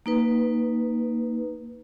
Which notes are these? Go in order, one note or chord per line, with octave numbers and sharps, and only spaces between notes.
A#3 D#4 B4